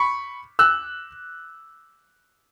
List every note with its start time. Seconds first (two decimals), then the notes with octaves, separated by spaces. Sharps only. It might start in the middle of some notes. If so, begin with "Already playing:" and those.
Already playing: B5 C#6
0.59 E6 F#6